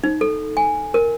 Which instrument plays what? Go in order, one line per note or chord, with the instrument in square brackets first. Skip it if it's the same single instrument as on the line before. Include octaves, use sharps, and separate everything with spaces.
[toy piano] D#4
A4
G#5
A#4